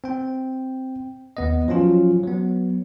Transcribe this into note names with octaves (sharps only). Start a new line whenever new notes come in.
C4 G5
D#2 B3 D#5
F3 F#3 C#4 F4
F#3 B3